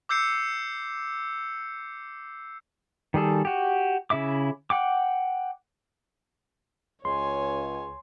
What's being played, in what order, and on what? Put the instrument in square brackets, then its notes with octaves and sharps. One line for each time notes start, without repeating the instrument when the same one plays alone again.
[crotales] D6 E6 G6 C7 C#7
[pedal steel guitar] D#3 G3 G#4 A4
F#4 G4
C#3 E4 E5 D6
F#5 G5 D6
[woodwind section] C#2 [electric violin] C#5 G#5 [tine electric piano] C6